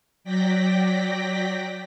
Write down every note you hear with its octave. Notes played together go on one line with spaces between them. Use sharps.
F#3 D5 G5 A#6 B6